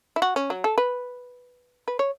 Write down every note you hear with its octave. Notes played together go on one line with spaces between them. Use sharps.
E4
F#4
C#4
F#3
A4
B4
B4
C#5